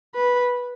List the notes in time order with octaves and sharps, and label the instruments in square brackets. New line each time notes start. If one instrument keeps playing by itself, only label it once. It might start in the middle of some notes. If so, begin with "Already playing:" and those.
[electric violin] B4